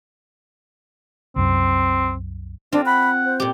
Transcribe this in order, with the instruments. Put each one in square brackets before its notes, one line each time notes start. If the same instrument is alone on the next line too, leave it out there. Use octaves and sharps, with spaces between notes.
[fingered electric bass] C2 F#2 [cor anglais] C4
[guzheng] C4 F4 [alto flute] D4
[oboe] F#5 [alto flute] B5
[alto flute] C5
[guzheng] A#2 G4